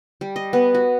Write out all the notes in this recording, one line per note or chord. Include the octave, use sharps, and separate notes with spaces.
G3
D#5
B3
F#4